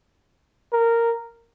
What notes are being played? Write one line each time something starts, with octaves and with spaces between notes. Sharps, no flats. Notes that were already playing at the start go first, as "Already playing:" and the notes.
A#4